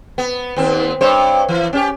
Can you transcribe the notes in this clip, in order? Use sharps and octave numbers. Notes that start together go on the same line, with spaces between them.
B3
D#2 C4
G2 C5 C#5
E3
C#4 G4